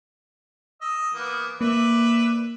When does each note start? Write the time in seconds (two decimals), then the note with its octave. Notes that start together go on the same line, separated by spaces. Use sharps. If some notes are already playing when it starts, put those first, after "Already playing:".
0.81 D#5 E6
1.14 E3 A#3 B3
1.61 A#3 B4 D5 E5